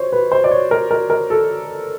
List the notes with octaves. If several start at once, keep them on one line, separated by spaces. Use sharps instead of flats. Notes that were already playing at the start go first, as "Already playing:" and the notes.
Already playing: C5 C#5
B4
C5
D5
C#5
A#4
A#4
A#4
A4